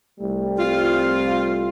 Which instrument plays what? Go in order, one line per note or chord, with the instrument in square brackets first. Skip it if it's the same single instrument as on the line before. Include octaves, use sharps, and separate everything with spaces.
[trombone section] C2 G3 A3
[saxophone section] C4 F4